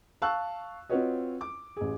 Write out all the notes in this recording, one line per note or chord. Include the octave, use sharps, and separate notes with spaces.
F5 A5 C#6 E6 F#6
C4 F4 F#4 B4 C#5 D#5
D6
A1 G#4